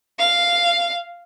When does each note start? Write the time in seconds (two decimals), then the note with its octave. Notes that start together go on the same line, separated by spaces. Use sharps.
0.19 F5